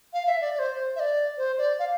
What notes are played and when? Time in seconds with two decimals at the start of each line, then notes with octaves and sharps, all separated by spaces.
0.13 F5
0.27 E5
0.41 D5
0.55 D5
0.59 C5
0.96 E5
1.00 D5
1.38 C5
1.58 D5
1.79 F5